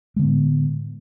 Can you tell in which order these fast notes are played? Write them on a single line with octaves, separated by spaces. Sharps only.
G#3 D3 B3 A2